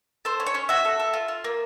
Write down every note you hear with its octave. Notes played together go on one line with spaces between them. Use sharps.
A4 C5
C#4
C#5
C#4
F#4 E5
A4
A4
F4
F4
A#3